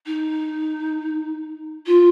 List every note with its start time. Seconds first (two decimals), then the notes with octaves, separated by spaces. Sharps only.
0.06 D#4
1.86 F4